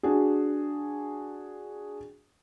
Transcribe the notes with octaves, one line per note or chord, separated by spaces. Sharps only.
D4 F#4 G#4